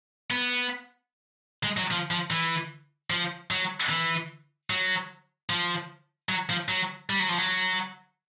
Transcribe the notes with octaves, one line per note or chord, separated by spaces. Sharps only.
B3
G#3
F#3
F3
F3
E3
F3
F#3
E3
F#3
F3
F#3
F3
F#3
G3
F#3
F3
F#3